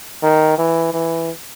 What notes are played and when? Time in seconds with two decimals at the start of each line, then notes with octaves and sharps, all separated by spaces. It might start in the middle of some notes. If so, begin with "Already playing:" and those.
0.23 D#3
0.58 E3
0.93 E3